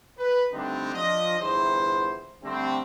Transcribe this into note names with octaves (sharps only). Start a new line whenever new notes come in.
B4
D3 G3 A3 C4 D4 D#4
F3 D4 D#5
G1 E2 E4 C5
D3 G3 A3 C4